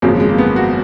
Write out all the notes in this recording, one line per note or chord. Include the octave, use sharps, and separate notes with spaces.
G#1 F#2 C#3 F3 G#3 A#3
G#3
A#3
B3
F#4